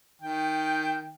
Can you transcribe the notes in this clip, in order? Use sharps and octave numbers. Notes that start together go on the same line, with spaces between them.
D#3 G5